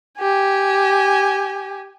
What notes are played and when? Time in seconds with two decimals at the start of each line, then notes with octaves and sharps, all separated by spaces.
0.19 G4 G#5